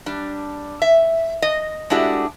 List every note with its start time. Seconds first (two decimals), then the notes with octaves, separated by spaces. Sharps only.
0.06 G3 D4
0.82 E5
1.42 D#5
1.90 G#3 A3 D4 E4 F#4 G4